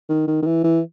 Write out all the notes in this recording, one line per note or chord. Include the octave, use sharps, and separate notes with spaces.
D#3
D#3
D#3
E3
E3